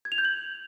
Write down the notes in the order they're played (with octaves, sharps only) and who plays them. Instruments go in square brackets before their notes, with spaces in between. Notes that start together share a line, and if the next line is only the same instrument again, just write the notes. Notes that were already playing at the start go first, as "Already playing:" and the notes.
[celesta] G#6
F7
G6
F#7